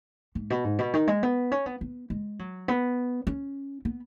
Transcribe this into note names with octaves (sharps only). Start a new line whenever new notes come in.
G#2
B2
G#2
B2
D#3
G#3
B3
C#4
B3
B3
G#3
F#3
B3
C#4
B3